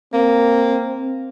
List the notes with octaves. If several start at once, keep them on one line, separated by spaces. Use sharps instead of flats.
A#3 C4